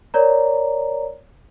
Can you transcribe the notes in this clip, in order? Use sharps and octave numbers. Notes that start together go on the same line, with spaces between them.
A#4 C#5 D5 A#5